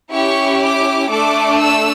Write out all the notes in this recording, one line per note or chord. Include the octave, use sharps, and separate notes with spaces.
C#4 E4 G4 C#6
D6
A3 D4 A4 D6
E6